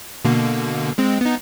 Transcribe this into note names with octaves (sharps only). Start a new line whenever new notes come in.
B2 D3 A#3
G#3 C4
B3 D#4